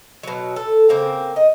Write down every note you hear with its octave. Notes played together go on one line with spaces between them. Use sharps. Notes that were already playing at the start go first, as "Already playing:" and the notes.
B2 F#3
A4
C#3 A#3 C4
D#5